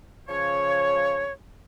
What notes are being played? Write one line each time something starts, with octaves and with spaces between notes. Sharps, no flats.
C#3 F3 C#5